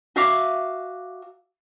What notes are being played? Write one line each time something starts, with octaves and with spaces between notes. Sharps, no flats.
F#4 E5 F5 D6